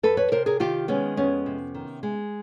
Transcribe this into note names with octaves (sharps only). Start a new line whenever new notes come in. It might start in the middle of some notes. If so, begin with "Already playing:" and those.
F2 A4 B4
B4 C#5
C3 A#4 C5
G#4 A#4
D#3 F4 G4
G#3 B3 C#4
F2 B3 C#4
C3
D#3
G#3